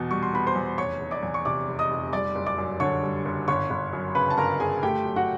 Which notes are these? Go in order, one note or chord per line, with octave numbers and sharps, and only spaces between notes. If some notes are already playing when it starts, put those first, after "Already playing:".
Already playing: E2 B2 B3
G3 C#6
C6
B3 B5
C5 C6
E2
F1 C#5 C#6
F1
D5 D6
E2
C#6
C3 D5 D6
F1
D#5 D#6
F1
G3 D5 D6
F#1
D5 D6
F#2
D3 C#5 C#6
G3
F#1
G1 C#5 C#6
G1
F#2
C#3 B4 B5
A5
G1 A#4 A#5
G1 G#4 G#5
A3 G4 G5
F#2
F#4 F#5